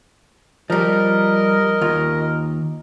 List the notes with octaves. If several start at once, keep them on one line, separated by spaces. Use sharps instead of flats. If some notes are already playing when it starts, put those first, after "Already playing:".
F3 G3 A#4 D#5
D#2 F4